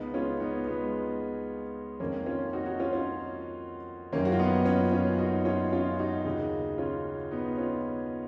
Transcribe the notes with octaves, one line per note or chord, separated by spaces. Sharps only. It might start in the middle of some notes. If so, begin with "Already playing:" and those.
Already playing: C#2 C#3 B3 D#4
C#4 F4
B3 D#4
G#3 B3
F2 D#3 A#3 C#4
C#4 F4
D#4 F#4
D#4 F#4
C#4 F4
C#4 F4
F#2 D#3 A#3 C#4
F#4
F4
B3 D#4
C#4 F4
C#4 F4
D#4 F#4
C#4 F4
C#4 F4
D#4 F#4
D#2 C#3
C#4 F4
B3 D#4
C#4 F4